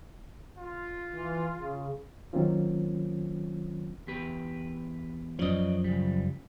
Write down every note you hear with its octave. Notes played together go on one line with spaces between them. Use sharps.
F4
E3
C#3
D#3 F#3 A#3 C4 C#4 F4
E2 G4 B4
F#2 F3 C#4 D5 D#5
C#3 G3